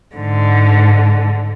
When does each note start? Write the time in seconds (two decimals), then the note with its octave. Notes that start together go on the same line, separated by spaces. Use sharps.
0.16 G#2 D3